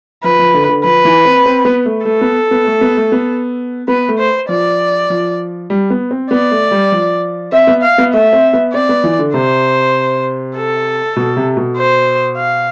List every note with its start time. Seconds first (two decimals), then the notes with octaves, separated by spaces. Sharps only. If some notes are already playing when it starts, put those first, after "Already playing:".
0.24 F3 B4
0.39 F3
0.54 D3
0.69 D3
0.84 F3 B4
1.05 E3
1.25 C4
1.46 C4
1.65 B3
1.86 A3
2.05 A3 A4
2.21 B3
2.51 B3
2.67 A3
2.81 B3
2.97 A3
3.12 B3
3.88 B3 B4
4.09 A3
4.18 C5
4.49 F3 D5
5.10 F3
5.70 G3
5.90 B3
6.11 C4
6.31 B3 D5
6.51 A3
6.71 G3
6.92 F3
7.52 C4 E5
7.67 B3
7.82 F5
7.98 B3
8.13 A3 E5
8.33 C4
8.53 B3
8.73 C4 D5
8.89 B3
9.04 E3
9.19 D3
9.34 C3 C5
10.56 A4
11.16 B2
11.37 C3
11.57 B2
11.77 C5
12.38 F5